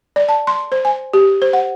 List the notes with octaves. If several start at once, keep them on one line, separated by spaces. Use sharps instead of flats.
D5
A5
C6
C5
G#5
G4
C5
F#5